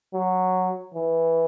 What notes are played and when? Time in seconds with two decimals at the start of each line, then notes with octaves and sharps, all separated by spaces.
0.14 F#3
0.94 E3